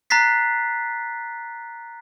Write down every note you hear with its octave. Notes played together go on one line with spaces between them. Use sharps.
A#5 F#6 A6 B6 C7